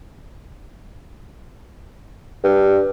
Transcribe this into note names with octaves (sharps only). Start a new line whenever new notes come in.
G2